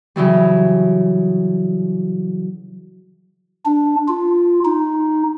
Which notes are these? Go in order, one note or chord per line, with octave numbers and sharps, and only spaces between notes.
C#3 E3 F#3 G3
D4
F4
D#4